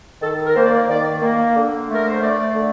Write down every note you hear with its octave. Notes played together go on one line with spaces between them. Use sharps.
D#3 A4
A#4
A#3 C5
D5
D#3 D5
A#3
D3
A3
A#4
C5
A3 D5
D3